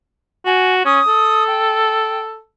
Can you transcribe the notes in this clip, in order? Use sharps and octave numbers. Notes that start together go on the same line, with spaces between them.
F#4 G#5
C#4 D#6
A4
G5